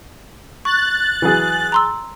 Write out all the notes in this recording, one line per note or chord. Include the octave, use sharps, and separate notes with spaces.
C#6 F#6 A6
E3 F#3 G#4
A#5 C6 E6